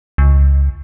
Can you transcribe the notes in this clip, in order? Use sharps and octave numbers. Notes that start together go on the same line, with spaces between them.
C#2